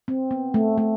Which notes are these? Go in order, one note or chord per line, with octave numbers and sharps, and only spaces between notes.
C4
B3
A3
A3